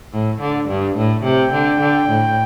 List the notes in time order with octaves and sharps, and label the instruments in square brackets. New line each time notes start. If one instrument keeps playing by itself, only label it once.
[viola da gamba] A2
D3
G2
A2
[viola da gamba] C3 [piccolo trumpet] G5
[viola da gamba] D3
D3
A2